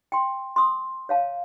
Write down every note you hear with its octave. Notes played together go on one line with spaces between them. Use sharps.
G5 C6
C6 D#6
C#5 F5 A5